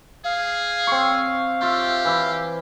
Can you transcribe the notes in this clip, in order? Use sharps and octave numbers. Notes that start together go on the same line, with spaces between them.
G#4 F5
C4 C#6
F4 G4 E5
E3 E5 D6